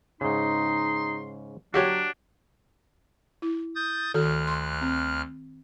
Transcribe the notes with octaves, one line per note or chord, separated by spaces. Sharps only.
G#2 C#3 D#4 C6
F#3 D4 F#4 G4 C#5
E4
D#6 G6 A6
D2 D#3 F#4 A4 F6 F#6
C6
C4